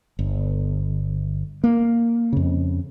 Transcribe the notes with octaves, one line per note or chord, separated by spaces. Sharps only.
G1
A#3
F2 C#3